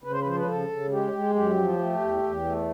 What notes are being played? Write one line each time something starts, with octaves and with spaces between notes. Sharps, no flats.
C#3 B4
C5
B4
F3 C5
B4
C#3 A4
C#3
G#3 G4
G#3
F#2 G4
F3
A3
E2
E2
A3